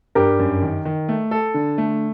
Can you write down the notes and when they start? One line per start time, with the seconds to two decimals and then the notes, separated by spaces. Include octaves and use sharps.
0.15 G2 G4 A#4
0.39 F#2
0.62 D#3
0.85 D#3
1.09 A3
1.31 A4
1.54 D3
1.78 A3